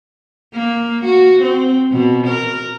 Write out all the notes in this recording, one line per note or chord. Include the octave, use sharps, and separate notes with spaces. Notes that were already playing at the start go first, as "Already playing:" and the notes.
A#3
F#4
C4
B2
A#4